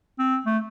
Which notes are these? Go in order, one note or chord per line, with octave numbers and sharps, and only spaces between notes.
C4
A3